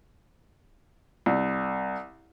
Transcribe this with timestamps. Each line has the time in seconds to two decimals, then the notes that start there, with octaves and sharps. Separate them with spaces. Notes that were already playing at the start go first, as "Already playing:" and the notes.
1.26 C2